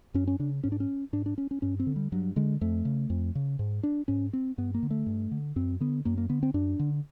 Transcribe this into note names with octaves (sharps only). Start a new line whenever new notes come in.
F#2 C#4
C#4
C#3 D4
G#2 C#4
D4
C#4
G#2 D4
D4
C#4
C#4
G2 C#4
C4
D3
G3
G2 F#3
D3 G#3
F2 A3
C#3
F2
C#3
G#2
D4
G#2 C#4
C4
G2 B3
A#3
D3
A3
G2
D3
F#2 C4
D3 B3
F#2 A#3
A#3
D3 B3
C4
F#2 D4
D3